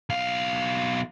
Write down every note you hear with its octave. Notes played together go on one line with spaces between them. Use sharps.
B1 F5